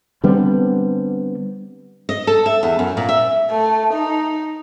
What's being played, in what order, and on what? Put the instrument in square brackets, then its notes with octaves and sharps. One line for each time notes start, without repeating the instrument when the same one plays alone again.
[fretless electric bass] D3 G3 B3 C4
[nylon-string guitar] D#5
A4
E5
E2
F#2
A#2
E5
[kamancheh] A3
D#4